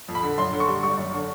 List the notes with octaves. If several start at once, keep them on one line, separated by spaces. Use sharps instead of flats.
F2
B5
D3
F#2 C6
D3
C#6
G3
G#1 C#6
F#2
D3